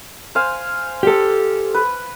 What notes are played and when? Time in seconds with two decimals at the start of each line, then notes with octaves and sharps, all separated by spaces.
0.35 C5 F5 G#5
1.03 G4 A4
1.74 B4